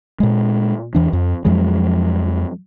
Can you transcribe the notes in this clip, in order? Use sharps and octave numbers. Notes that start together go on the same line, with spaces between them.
A#2 G#3
E2 E3 D4
F2
F2 F3 F#3 G#3